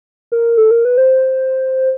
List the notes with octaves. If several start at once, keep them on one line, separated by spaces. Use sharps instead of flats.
A#4
A4
A#4
B4
C5